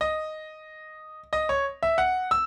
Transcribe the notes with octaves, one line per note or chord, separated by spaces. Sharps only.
D#5
D#5
C#5
E5
F#5
E6